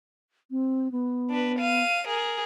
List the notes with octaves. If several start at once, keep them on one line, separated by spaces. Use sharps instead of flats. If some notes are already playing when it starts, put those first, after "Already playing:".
C4
B3
D4 B4
F5 D#7
G#4 A#4